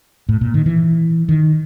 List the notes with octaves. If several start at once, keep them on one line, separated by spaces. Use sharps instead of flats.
A2
A#2
D#3
E3
D#3